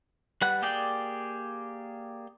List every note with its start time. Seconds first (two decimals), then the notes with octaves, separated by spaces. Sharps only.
0.42 G3 B4 F#5 F#6
0.62 A#3 G4 G#4 D5 G5